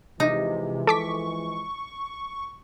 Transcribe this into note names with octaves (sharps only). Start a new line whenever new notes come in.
C3 E3 F3 G#3 D#4
A4 C#6 D6 B6